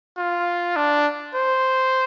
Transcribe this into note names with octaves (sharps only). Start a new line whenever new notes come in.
F4
D4
C5